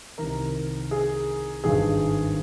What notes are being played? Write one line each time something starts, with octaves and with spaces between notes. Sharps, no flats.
C2 C3 D#3 A#4
G#4
G#1 G2 D#3 G#4